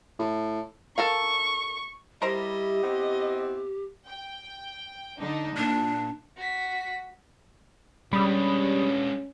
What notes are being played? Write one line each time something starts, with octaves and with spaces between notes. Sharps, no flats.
A2
A4 A#4 F5 C#6
G3 E4 G4 A#4 C5 D#5 A#5
B3 C4 E4
G5
D3 D4 D#4
A#2 D4
F#4 B6
G3 G#3 C#4 D4 B5 D#6